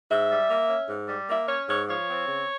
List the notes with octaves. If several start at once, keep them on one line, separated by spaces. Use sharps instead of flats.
G#2 E5
G3
A#3
C#4
G#2
G3
A#3 E5
C#4 C#5
G#2 C#5
F3 C#5
C4
C#3